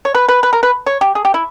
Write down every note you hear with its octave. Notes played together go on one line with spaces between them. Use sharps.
C#5
B4
B4
B4
A#4
B4
C#5
G4
G#4
G4
E4